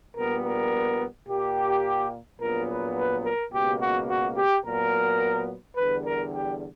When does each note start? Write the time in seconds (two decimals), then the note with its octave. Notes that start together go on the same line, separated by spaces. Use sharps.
0.16 A#1 A#2 G3 B3 A#4
0.43 A#4
1.28 A#2 A#3 G4
2.40 A#1 A#2 F#3 B3 A#4
2.68 B4
2.96 B4
3.24 A#4
3.52 C#2 B2 A#3 G4
3.80 F#4
4.08 F#4
4.37 G4
4.64 A#2 F#3 B3 A#4
5.76 E2 D3 G3 B4
6.05 A#4
6.32 G4